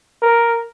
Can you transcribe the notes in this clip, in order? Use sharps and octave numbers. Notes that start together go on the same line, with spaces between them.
A#4